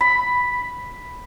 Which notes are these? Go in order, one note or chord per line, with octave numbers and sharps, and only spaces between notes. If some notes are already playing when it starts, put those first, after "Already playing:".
B5